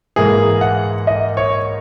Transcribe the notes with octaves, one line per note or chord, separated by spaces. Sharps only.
G#2 E3 A#3 G#4
F#5
D#5
C#5